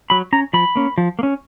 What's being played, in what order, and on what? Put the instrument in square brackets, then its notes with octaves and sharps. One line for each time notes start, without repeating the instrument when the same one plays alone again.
[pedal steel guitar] F#3 B5
C#4 A#5
F3 B5
A#3 C#4
F3
A#3
C#4